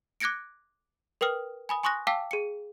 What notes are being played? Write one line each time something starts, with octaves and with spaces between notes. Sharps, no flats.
D6 F#6 G#6 A#6 C#7 D7
A#4 B4 G5 D#6 F6
G#5 B5 D#6
G#5 C6 C#6 D#6 F#6 A#6
F5 G5 A5 D6 E6 B6
G#4 C#7